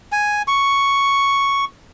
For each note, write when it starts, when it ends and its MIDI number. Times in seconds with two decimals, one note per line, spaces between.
0.12 0.42 80
0.48 1.65 85